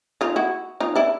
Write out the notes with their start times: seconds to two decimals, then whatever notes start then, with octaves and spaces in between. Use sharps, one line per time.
0.21 D#4 F4
0.36 E4 F#4
0.80 D#4 F4
0.95 D4 E4